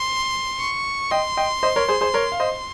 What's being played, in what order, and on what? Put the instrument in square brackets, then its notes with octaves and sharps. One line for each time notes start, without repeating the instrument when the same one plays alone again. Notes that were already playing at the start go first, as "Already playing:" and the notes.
Already playing: [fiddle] C6
C#6
[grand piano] D#5 G5 [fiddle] C6
[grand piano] D#5 G5
C5 D#5
A#4 C#5
G#4 C5
G#4 C5
A#4 C#5
F5
C5 D#5